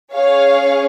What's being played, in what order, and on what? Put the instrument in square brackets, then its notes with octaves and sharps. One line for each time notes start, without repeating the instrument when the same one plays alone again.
[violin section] C#4 G#4 C#5 F5